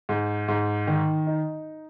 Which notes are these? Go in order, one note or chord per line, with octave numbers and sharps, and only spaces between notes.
G#2
G#2
D#3
D#4